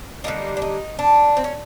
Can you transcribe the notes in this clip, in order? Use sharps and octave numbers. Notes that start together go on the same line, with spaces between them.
D3 G3 A#3 D#4
D4
D#4
D4
C4
C#4